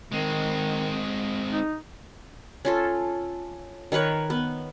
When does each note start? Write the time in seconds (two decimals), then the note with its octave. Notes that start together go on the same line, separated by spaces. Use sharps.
0.12 D#3 G#3 C4
1.49 D#4
2.65 C#4 F4 A4
3.92 D#3 A#4 B4 C#5
4.30 B3